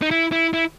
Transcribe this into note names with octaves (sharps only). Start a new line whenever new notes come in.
D#4
E4
E4
E4